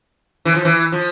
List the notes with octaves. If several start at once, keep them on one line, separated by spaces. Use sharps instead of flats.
E3
F3
E3
F3